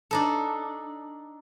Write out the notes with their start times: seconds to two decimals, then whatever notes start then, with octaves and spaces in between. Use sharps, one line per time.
0.11 D4 D#4 A4